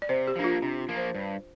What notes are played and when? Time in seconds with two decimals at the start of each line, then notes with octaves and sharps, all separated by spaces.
0.02 D5
0.09 C3 C5
0.27 G4
0.36 F3 A#3 D4
0.44 F4
0.62 C3 D4
0.79 F4
0.89 F3 A#3
0.97 C5
1.15 G2